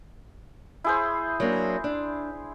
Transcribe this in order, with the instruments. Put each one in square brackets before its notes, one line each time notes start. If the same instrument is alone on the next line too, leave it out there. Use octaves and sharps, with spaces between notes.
[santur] E4 G#4 C5
[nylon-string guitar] F#3 A#3 D4
D4